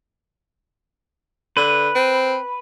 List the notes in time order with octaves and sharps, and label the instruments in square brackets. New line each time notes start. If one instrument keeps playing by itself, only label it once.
[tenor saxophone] D3 [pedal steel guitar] B4
[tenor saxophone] C4